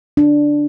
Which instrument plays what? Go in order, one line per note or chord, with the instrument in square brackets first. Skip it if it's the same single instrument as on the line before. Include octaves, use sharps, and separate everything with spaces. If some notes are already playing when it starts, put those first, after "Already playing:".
[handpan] D4